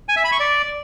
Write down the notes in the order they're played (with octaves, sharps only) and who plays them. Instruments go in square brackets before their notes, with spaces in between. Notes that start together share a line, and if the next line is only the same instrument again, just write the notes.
[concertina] G#5
E5
B5
C#6
D5